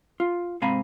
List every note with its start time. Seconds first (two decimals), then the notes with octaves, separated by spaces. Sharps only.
0.20 F4
0.62 G#2 C3 F5 G#5 A#5 B5